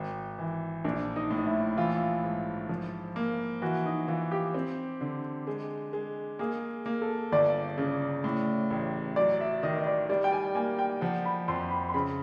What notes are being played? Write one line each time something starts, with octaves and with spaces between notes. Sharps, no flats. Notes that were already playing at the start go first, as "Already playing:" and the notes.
Already playing: G#1
E3
A#1 D4
D#4
A2
D#4
E4
E3 F4
G#2
F3
A#3
E3 F#4
D#4
E3 F4
G4
C4
D3
G#3
G#3
A#3 G#4
A#3
A4
G1 D5
C#3
A2
A1
F#3 D5
E5
D#3 D#5
D#5
D5
G3 D5
G5
G#5
A#3 G#5
G5
F3 F#5
B5
F2 C6
B5
C6
C#3 B5